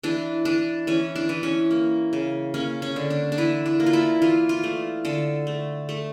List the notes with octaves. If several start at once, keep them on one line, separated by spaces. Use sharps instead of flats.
E3 D4
E3 D4
E3 C#4
D4
E3
C#4
A#3
C#3
A#3 C#4
C#4
D3
D4
D4
E3 E4
D4
A#3
F4
E4
E3 F4
F4
A3
D3 A4
A3
A3